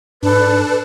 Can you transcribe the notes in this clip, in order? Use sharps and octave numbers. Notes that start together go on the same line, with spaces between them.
G#2 D4 A4 B4